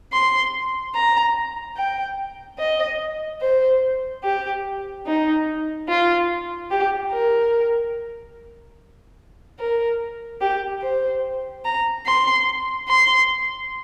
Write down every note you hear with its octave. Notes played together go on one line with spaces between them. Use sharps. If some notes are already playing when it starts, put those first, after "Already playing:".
C6
A#5
G5
D#5
C5
G4
D#4
F4
G4
A#4
A#4
G4
C5
A#5
C6
C6